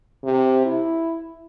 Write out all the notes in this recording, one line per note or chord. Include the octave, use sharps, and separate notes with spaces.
C3
E4